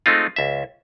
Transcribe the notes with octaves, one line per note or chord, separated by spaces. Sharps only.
G#3 A3 C4 D#4 F4
C#2 E5